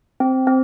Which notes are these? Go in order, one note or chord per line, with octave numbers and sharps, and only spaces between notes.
C4
C4